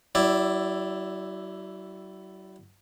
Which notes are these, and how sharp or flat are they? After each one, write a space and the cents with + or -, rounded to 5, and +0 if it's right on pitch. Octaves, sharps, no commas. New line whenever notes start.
F#3 +40 E4 +0 D5 +0